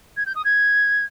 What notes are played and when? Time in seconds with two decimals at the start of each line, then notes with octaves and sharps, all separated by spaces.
0.17 G#6
0.26 G6
0.35 D#6
0.45 G#6